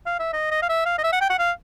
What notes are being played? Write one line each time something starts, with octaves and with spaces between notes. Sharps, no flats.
F5
E5
D#5
D#5
F5
E5
F5
D#5
E5
F#5
G5
F#5
F5